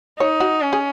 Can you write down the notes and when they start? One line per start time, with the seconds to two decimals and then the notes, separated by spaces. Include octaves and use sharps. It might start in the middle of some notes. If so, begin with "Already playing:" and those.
0.20 D#4 C#5
0.40 F#4
0.62 C#4
0.73 G#4